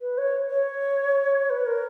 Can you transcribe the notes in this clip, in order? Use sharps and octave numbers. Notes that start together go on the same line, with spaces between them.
B4
C#5
C#5
B4
A#4